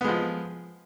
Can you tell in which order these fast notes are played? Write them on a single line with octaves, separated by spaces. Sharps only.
B3 G#3 F3